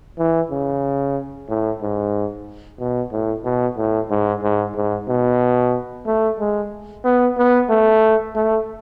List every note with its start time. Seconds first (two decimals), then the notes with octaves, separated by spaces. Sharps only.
0.18 E3
0.50 C#3
1.49 A2
1.81 G#2
2.79 B2
3.12 A2
3.44 B2
3.77 A2
4.10 G#2
4.43 G#2
4.76 G#2
5.08 B2
6.07 A3
6.39 G#3
7.05 B3
7.37 B3
7.70 A3
8.35 A3